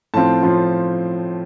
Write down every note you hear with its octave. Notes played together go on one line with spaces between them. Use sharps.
A2 F3 C4 F4 A5
A2 F3 C4 F4